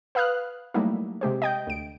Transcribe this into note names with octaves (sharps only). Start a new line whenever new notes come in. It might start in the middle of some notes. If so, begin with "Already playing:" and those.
B4 F5 D#6 F6 F#6
F#3 G3 A3 A#3 D#4 E4
C3 G#3 G4 C5
D#5 G5 G6
D2 D7